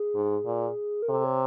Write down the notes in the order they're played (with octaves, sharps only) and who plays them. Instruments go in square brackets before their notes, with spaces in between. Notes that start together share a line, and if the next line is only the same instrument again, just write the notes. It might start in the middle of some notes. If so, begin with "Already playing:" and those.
Already playing: [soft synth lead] G#4
[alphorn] G#2
A#2
[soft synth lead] A#4
[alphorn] C3 [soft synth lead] A4
[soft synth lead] C#5